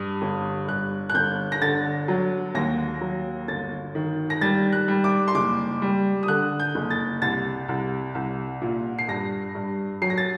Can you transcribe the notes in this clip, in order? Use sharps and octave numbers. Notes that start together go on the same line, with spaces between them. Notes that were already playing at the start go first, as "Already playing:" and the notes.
Already playing: G2 D#6
G1
G2 F#6
F#6
G1 G6
A#6
D3 A6
F#3
D#2 A#6
F#3
G1 A6
D#3
A#6
G3 A6
F#6
G3
D6
C6
F#1 D6
G3
D#6
D3 F#6
G6
F#1
A6
C2 A6
C2
C2
A#2
C7
G2 A#6
G2
F#3 C7
A#6
A6